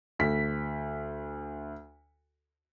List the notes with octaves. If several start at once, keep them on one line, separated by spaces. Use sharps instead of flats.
D2 B6